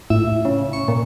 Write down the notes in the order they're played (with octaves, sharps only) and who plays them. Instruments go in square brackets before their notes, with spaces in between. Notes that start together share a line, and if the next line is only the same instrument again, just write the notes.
[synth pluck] A2 [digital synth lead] E5
[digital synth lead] C#3
C#6
A#2